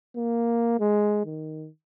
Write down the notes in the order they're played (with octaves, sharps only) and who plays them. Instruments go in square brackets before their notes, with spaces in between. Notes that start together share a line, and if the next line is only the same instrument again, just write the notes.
[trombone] A#3
G#3
D#3